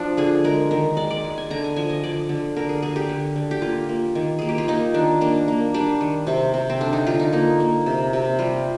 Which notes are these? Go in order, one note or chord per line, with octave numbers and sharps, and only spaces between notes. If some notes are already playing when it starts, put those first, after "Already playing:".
Already playing: F3 D4
D3 G#4
G#3 A#4
D#3 A#4
G#3 D5
D5
G#3
G#5
D3 A#5
G#5
F3 G#5
D#5
D3 D5
D3
D3 A#4
G#4
D3 G#4
G4
D3
D3
G4
A#3 F4
A#3
D#3
A#3 G#4
G4
F4
A#3 D#4
D#3 D4
A#3 D4
A#3
G3 D4
D#3
C3 C4
C3
C4
D3 D4
D#4
D3 F4
D#4
A#3 D#4
A#3
C3
C3
G3 F4